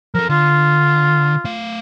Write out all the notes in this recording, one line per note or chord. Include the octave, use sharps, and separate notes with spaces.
F3 A4 A#4
D3 F4
A3 F5